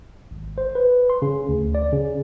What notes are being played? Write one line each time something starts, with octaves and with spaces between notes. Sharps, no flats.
G#1
C5
B4
C6
C#3
D2
D5
C#3